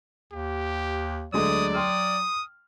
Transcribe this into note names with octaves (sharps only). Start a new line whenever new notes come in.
D#2 G4
D2 F#3 G#3 A3 D5 D#6
G5 C6 D#6 F6